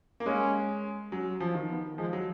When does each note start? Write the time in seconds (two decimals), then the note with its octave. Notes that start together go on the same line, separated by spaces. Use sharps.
0.20 A#3
0.26 G#3 C#4
1.12 F#3 C#4
1.40 F3
1.55 D#3
1.69 B3
1.98 F3 G#3
2.13 F#3